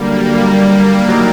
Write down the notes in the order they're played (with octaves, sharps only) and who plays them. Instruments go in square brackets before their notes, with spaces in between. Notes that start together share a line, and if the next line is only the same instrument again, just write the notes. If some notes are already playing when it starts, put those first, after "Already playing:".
Already playing: [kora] D3 F#3 [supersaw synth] G3 A#3
[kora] F#3 A#3 D#4